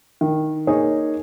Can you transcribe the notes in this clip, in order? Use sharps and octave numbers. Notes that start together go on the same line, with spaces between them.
D#3
A#3 D#4 G#4 C#5